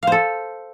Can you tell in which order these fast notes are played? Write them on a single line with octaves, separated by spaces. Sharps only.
F5 C5 A4